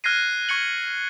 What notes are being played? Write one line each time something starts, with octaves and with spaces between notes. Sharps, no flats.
F6 F#6 G#6 A#6 C7 D#7
C#6 G#6 C#7 F#7